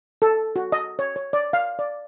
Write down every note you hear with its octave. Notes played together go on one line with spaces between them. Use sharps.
A4
F#4
D#5
C#5
C#5
D5
F5
D5